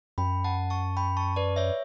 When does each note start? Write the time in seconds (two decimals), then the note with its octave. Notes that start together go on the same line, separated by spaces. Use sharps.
0.18 F#2 G5 B5
0.44 F#5 A5
0.70 A5 C#6
0.97 G5 B5
1.17 A5 C#6
1.36 B4 D5
1.56 C#5 E5